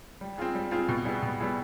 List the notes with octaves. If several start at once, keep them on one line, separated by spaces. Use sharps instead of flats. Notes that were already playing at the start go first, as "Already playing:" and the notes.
G3
C4 F4 G#4
G3
C4 F4 G#4
B2
G3 B3 E4 G#4
B2
G3 B3 E4 G#4